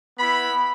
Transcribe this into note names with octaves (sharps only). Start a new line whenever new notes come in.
B3 E4 B5